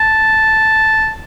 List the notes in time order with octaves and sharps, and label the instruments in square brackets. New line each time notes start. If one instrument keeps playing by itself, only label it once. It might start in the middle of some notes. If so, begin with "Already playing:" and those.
Already playing: [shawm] A5